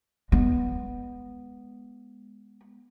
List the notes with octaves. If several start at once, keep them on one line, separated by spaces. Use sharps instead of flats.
G#3 B3